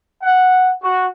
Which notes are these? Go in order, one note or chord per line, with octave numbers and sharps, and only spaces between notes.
F#5
F#4